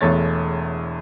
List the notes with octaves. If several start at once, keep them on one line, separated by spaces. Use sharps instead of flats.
E1 E2 A3 C#5 A6